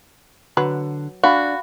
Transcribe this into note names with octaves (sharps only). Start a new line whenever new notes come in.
D3 F#3 B4
D4 F#4 F5 G#5 B5